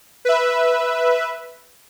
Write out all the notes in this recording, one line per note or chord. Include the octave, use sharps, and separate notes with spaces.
B4 E5